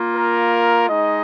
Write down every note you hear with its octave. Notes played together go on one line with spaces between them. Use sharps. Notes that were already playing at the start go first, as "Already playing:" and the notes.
Already playing: A#3 F4
A#4
G#3 D#4 D#5